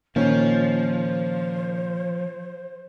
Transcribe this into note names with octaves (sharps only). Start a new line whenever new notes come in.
A#2 D#3 F3 A#3 C#4 C5